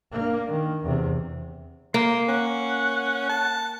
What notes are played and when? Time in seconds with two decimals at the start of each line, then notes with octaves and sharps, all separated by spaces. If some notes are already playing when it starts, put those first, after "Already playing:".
0.12 A#3 D4
0.51 D#3
0.84 E2 C3
1.94 A#3 C6
2.29 C#4 F#5
3.29 A5